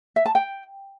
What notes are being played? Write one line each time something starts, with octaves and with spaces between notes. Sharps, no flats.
E5
A5
G5